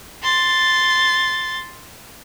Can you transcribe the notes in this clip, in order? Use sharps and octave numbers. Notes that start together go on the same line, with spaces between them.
C6 A6